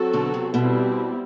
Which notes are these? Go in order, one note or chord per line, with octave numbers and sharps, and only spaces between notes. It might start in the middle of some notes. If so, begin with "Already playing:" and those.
Already playing: F#3 C4 F#4 A4
B2 D3
C3
B2 G3 C4 E4